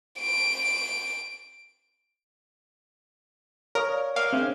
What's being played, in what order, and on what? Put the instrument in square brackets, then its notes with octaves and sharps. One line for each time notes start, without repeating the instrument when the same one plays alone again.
[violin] D7
[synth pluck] A#4 [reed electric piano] C#5 [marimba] F5 D#6 F6
[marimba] D5
[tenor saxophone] A#3 [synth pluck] F5
[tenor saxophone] C#3 [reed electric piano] C4 [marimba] D4 E5